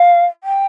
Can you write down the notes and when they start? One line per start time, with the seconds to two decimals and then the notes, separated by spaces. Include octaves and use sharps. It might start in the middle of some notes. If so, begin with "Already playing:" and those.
Already playing: F5
0.44 G5